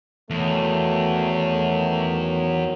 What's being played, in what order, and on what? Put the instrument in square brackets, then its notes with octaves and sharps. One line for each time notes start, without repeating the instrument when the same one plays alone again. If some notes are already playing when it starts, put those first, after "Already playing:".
[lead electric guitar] E2 [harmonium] D#3 F#3 [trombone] A3